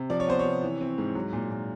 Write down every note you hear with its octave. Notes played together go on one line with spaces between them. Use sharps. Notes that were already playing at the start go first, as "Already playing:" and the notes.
Already playing: C3
F3 D5
C#5
B3 C5
C#5
C3
E3
C4
G#2
F#3
A#2
A#2